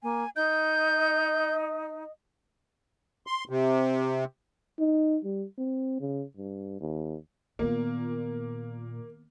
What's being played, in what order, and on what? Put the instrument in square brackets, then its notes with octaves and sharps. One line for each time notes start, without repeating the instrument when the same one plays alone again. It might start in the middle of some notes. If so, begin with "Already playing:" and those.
[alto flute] A#3 [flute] G#5
[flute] D#4 [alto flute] D#5 [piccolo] G6
[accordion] C6
C3
[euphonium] D#4
G3
C4
C#3
G2
D#2
[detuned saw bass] A#2 [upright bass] D#3 B3 [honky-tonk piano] A#3